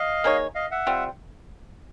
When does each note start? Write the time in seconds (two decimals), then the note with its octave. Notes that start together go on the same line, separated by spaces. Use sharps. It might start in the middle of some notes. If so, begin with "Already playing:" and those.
Already playing: D#5 F5
0.24 A#3 D#4 G#4 C#5
0.55 D#5 F5
0.71 E5 F#5
0.87 G3 C4 F4